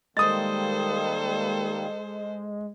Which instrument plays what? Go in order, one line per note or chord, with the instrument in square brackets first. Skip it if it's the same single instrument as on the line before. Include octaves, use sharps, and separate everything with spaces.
[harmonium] D#3 G3 A#3 [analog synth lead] G#3 [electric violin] A4 C5 [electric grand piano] D#6 A6